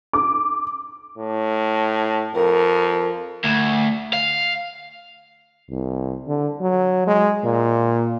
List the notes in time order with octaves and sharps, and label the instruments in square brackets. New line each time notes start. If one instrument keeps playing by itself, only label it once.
[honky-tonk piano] D6
[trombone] A2
[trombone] F2 [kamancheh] A#4
[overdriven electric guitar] D2
F5
[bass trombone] C2
D3
F#3
G#3
A#2